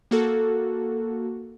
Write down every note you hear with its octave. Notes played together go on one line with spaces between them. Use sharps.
A#3 F#4 A4